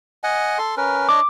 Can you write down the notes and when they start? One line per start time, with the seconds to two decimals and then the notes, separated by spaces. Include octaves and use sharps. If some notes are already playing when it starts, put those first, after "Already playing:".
0.24 D#5 F#5 G#5
0.58 A4 C6
0.77 C#4 A#4 B4
1.09 D4 C#5 D#5 D6